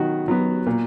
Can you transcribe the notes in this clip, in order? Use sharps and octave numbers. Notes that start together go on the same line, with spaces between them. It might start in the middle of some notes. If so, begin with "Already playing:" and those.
Already playing: D#3 F#3 B3 F#4
F#3 B3
A#2